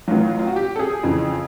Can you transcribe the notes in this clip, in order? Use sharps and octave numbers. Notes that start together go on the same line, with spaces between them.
A1 A2 F#3 F4
F4
F#4
G4
A4
G#4
F2 C#3 E3